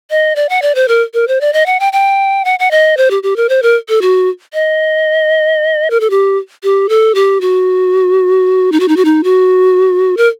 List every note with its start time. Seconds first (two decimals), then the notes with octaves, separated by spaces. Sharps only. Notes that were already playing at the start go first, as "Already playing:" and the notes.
0.10 D#5
0.36 D5
0.49 F#5
0.62 D5
0.75 C5
0.88 A#4
1.14 A#4
1.28 C5
1.41 D5
1.53 D#5
1.66 F#5
1.80 G5
1.93 G5
2.45 F#5
2.59 F#5
2.71 D#5
2.97 C5
3.11 G4
3.23 G4
3.36 A#4
3.49 C5
3.63 A#4
3.89 A4
4.02 F#4
4.53 D#5
5.90 A#4
6.00 A4
6.10 G4
6.63 G4
6.89 A4
7.15 G4
7.41 F#4
8.72 D#4
8.80 F#4
8.88 D#4
8.96 F#4
9.05 D#4
9.24 F#4
10.17 A#4